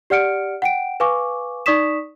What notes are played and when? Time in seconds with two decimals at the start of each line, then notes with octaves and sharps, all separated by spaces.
0.10 G4 D5 F#5 F6 C#7 D7
0.62 F#5 G5 D7
1.00 B4 F5 G#5 C#6 D6
1.66 D#4 D5 C#6 D#6 B6 E7